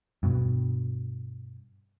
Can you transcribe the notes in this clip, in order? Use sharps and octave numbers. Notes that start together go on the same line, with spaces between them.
G2 B2